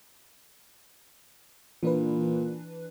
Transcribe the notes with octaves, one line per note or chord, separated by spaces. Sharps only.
A#2 E3 D4 B4